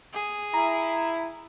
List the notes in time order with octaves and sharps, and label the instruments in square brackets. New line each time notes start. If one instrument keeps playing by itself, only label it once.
[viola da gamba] G#4
[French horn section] E4 [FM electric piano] A#5